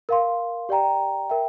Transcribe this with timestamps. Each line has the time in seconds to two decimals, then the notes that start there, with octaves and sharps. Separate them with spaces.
0.09 A#4 F5 C6
0.69 G4 D5 G5 A#5
1.29 A#4 E5 G5